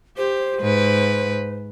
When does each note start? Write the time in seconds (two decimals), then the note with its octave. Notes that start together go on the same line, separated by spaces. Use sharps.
0.17 G4 C5
0.60 G#2 B4